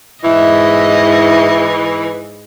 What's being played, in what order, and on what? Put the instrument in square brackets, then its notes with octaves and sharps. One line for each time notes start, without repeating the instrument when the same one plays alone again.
[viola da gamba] G#2 D#5 [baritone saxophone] E3 [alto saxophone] E4